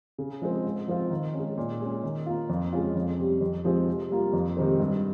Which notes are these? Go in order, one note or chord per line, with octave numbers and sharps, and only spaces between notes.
C#3
F3 G#3 C4
G#2
F3 C4 F4
D#3
G#3 C#4
A#2
G#3 C#4
D#3
A#3 F4
F2
C#3 G#3 C#4 F4
F2
C3 G3
F2
C3 F3 G#3 C4
C3
G3 A#3 F4
F2
C3 D#3 G#3 C4
G2